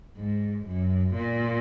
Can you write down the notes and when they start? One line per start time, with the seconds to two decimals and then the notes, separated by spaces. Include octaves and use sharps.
0.18 G#2
0.66 F#2
1.15 A#2